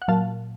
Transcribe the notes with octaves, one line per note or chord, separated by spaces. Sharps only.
F#5
A#2 F#3 F5 A5